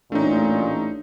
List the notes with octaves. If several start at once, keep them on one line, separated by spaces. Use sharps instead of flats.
A1 A#2 A3 D4 D#4 C#5